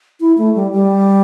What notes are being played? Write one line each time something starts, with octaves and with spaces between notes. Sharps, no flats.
E4
A3
G3
G3